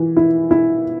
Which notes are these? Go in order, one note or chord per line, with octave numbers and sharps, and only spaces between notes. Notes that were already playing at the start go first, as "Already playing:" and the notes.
Already playing: E3
E4
E4